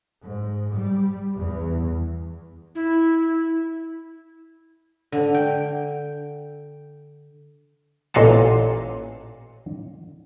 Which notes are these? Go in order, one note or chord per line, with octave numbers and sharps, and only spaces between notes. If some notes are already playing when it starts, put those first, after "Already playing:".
G#2
G3
E2
E4
D3
G5
A1 A#2 D#5 F5 F#5 A5